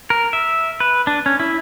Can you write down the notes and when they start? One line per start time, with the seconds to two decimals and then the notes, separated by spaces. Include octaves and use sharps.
0.10 A#4
0.33 E5
0.80 B4
1.07 D4
1.26 C#4
1.40 E4